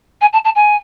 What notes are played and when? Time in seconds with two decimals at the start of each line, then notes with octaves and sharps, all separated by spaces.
0.21 G#5
0.33 A5
0.45 A5
0.55 G#5